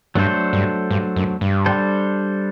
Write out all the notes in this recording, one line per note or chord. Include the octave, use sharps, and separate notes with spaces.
G2 F#3 A3 D4 A4 C5
G2
G2
F#2
G2
G3 D4 A4 C5